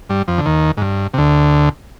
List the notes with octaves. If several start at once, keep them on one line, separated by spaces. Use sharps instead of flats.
G2 G3
F2 F3
D3
D#2 D#3
G#2
G2
C3
D2 D3